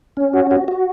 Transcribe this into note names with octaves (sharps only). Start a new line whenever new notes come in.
C#4
F#4
F#4
F#4